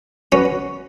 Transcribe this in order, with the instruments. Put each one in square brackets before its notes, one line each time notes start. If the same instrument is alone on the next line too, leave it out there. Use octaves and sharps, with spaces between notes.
[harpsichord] C#4 [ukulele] F#4 B4